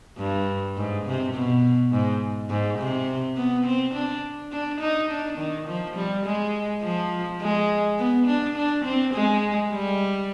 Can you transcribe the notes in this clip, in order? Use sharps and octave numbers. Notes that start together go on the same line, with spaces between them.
G2
G#2
C3
B2
G#2
G#2
C3
B3
C4
D4
D4
D#4
D4
D#3
F3
G3
G#3
F3
G#3
B3
D4
D4
C4
G#3
G3